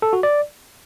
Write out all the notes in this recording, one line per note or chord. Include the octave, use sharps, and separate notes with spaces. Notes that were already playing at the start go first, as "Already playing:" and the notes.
A4
F#4
D5